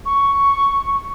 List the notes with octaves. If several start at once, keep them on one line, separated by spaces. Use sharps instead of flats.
C#6